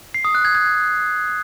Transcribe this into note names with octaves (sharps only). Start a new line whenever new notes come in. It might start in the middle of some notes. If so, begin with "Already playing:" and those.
C7
D#6
F#6
G#6
G#6